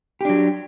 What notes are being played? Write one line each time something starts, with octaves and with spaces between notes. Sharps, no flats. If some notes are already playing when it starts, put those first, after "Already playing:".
F#3 D4 G4